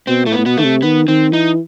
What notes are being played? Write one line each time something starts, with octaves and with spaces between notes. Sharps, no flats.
B2 C4
A2 A3
B3
A2
B2 B3
D#3 A3
C3
D#3 B3
D#3 C4
E3 D#4